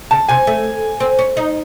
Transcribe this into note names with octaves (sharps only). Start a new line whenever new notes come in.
C#3 A5
C3 G#5
A3
C4
C#4
D#4